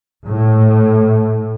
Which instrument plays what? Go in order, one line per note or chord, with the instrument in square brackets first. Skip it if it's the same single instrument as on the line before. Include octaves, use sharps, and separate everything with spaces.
[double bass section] A2